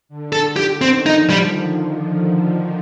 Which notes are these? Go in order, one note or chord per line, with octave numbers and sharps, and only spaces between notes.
D3
A4
G4
D#3 C4
D#4
F3
G3